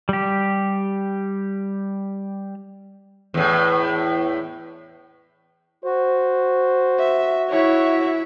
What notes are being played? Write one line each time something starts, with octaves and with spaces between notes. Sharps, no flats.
G3 G4
E2 A2
F#4 C5
E5
E4 C#5 E5